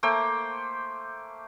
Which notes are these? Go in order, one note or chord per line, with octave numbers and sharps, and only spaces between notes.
A3 A#3 C5 G5